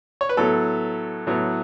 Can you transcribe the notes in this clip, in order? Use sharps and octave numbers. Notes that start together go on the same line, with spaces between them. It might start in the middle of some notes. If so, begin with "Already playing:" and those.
C#5
B4
A2 F#3 B3 A4
A2 F#3 B3